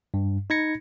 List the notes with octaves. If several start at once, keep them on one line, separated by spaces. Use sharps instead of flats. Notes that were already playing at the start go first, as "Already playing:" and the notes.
G2
D#4 B5 G#6 A#6 C#7